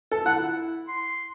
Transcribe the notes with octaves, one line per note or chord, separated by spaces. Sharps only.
A4
E4 F#5
C6